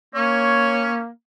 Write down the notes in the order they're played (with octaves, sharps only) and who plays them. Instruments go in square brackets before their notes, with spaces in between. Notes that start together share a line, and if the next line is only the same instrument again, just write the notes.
[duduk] A#3 [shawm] C#4 [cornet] C#5